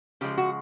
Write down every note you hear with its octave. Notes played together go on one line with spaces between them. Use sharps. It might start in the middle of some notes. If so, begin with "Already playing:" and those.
C#3 F3 G#3 G4
F#4